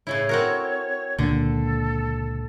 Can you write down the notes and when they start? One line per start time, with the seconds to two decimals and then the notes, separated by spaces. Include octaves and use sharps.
0.07 A2 C#3 E4 C#5
0.29 C4 F#4 A#4
1.19 C#2 A#2 D3 A#3 A4